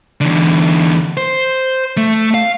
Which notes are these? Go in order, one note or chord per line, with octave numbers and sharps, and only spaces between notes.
E2 D3
C5
A3
F5